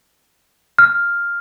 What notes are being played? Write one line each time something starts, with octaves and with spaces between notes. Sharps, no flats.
F6